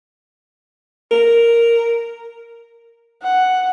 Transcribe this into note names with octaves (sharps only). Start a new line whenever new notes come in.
A#4
F#5